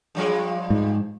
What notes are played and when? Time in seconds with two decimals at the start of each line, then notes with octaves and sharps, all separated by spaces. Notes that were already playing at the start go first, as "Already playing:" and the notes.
0.15 G2 F3 G#3
0.70 G#2